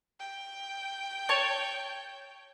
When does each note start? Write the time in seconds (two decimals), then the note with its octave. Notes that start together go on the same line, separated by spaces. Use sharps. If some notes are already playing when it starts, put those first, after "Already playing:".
0.20 G5
1.29 C#5 A5